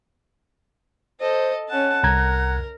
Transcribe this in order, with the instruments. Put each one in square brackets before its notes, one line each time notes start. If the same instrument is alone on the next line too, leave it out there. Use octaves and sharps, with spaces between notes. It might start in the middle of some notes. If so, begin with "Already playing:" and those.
[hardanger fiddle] A4 D#5 [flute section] C5
[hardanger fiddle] C#4 A5 [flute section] F#5 F#6
[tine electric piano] C2 A#5 G#6 [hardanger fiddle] A#4